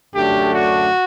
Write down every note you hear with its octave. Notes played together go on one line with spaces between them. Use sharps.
F#2 D3 A3 D4 G4
F#4